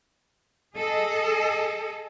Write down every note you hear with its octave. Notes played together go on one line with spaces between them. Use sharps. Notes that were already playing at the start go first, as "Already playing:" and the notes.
G#4 A4 D#5